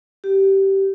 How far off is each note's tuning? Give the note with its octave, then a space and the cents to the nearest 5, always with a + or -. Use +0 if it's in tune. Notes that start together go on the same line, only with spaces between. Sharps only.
G4 -15